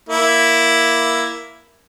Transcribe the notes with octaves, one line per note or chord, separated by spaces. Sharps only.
A#3 E4